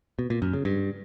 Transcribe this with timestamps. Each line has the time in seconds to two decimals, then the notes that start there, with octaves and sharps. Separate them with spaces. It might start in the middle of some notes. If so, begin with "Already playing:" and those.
0.19 B2
0.30 A#2
0.42 F#2
0.53 C#3
0.65 G2